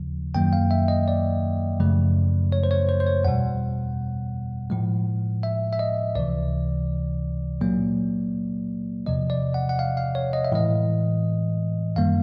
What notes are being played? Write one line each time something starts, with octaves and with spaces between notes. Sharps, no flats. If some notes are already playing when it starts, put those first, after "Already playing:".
Already playing: D#2 C#3 F3
F#2 D#3 F#3 A#3 G5
F5
E5
D#5
D5
F#2 C#3 F3 A3
C#5
C5
C#5
C5
C5
C#5
E2 B2 G3 F#5
A2 F3 G#3
E5
E5
D#5
C#2 C3 E3 D5
A#2 F#3 A#3
E2 C3 F3 D#5
D5
F#5
F#5
F5
F5
C#5
D#5
E5
A2 E3 G#3 D#5
F#2 D#3 G3 A#3 F5